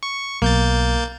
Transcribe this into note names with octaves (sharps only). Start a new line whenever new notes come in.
C#6
B1 A#3 G6 A6